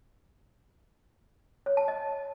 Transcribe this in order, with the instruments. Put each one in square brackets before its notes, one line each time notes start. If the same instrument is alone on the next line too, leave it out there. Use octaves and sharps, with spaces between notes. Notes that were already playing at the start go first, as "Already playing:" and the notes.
[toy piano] C#5
A5
D#5